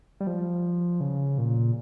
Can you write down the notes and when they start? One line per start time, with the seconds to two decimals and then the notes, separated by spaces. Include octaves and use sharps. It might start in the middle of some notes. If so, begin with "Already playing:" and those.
0.20 G3
0.27 F3
1.01 C#3
1.38 A#2